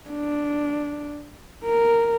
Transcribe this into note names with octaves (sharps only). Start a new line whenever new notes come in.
D4
A#4